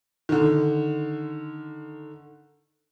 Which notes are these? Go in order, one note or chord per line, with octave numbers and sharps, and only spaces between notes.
D3 D#3